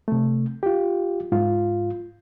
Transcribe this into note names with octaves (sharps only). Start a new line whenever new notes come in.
C3 A3
F4 G4
G#2 F4